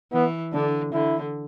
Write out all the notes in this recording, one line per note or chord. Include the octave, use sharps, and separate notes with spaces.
E3 B3
D3 D4
D3 E4